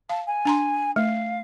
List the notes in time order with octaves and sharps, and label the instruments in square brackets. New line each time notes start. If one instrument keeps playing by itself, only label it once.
[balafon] F5 [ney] A5
[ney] G#5
[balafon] D4 A#5 C6
[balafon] A3 [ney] F5